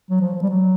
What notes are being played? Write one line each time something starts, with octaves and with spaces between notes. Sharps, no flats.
F#3
F3
F3
G3
F#3